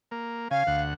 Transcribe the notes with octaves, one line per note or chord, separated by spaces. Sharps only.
A#3
C#3 F5 G#5
D2 F#5